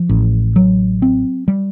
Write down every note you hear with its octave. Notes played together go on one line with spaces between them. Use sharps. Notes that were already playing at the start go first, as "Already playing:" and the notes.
Already playing: F3
A1
F#3
C4
G3